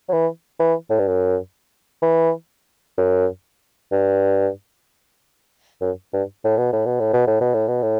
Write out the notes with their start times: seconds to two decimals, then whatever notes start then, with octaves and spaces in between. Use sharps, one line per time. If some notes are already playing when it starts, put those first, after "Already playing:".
0.09 F#3
0.13 E3
0.60 E3
0.90 A2
0.99 G2
1.08 F#2
2.02 E3
2.97 F#2
3.92 G2
5.81 F#2
6.13 G2
6.44 A2
6.58 B2
6.72 A2
6.86 B2
7.00 A2
7.13 B2
7.27 A2
7.41 B2
7.54 A2
7.68 B2
7.82 A2